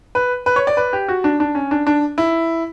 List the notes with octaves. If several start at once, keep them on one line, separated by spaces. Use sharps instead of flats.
B4
B4
C#5
D5
B4
G4
F#4
D4
D4
C#4
D4
D4
E4